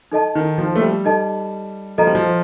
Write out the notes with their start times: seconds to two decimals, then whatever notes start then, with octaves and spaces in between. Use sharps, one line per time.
0.12 D#4 A4 D#5 A5
0.35 D#3
0.58 F3
0.76 A3
0.81 G3
1.05 D#4 A4 D#5 A5
1.98 F3 A4 D#5 A#5
2.07 G3
2.15 F3